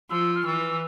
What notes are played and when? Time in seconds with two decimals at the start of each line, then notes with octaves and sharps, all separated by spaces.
0.10 F3 E6
0.36 F6
0.45 E3 E6